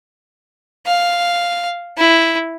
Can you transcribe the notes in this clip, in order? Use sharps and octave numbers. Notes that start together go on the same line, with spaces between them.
F5
E4